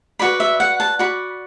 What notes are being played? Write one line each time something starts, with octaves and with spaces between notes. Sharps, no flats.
F#4 B4 D5 B5
E5
F#5
A5
F#4 D5 B5